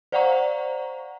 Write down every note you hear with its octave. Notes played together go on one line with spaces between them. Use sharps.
C5 D5 F5 F#5 A#5 C#6